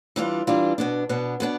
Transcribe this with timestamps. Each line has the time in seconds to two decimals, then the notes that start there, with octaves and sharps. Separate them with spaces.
0.16 E3 G3 D4 F4
0.47 E3 G3 D4 F4
0.78 B2 B3 D4
1.09 B2 B3 D4
1.40 B2 B3 D4